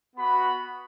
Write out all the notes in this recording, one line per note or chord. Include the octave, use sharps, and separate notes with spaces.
B3 F#4 B5